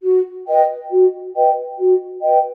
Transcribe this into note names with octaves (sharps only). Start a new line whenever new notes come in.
F#4
B4 D#5 G5
F#4
B4 D#5 G5
F#4
B4 D#5 G5